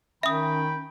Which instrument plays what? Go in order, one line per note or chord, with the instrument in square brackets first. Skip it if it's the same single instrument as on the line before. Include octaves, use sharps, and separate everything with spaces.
[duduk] D#3 [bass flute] C#4 [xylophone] E5 D#6 [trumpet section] G5 B5